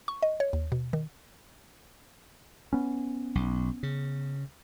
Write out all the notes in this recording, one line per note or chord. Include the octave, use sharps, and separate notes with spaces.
C#6
D#5
C#5
D#2
B2
D#3
B3 C#4
B1
C#3